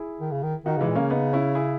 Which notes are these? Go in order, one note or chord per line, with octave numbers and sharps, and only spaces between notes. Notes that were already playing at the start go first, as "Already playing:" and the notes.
Already playing: E4 G#4
D#3
C#3
D#3
D#3 D#4 F#4
C#3 E3 G#3
A#2
C#3 A#3 C#4
B3 D#4
C#4 E4
E4 G#4